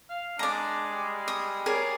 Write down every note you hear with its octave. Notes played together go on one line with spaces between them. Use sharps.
F5
G#3 D4 D5 A#5
G3
D#6
G#4 A#4 C#5 D5